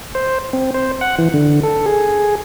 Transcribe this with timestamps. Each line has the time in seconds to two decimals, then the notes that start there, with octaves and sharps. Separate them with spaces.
0.15 C5
0.53 C4
0.74 C5
1.01 F#5
1.18 E3
1.34 D3
1.63 A4
1.86 G#4